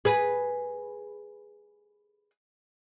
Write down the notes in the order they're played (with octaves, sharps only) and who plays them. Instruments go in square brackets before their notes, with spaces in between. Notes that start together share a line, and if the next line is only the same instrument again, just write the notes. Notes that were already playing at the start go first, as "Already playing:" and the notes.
[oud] G#4 B4